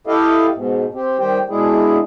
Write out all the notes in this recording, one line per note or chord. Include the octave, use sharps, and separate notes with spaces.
E4 G4 A4 D#5 F5
G#2 B2
C4 G4
D#3 G3 G4 C5 G5
B2 G#3 D4 E4 G#4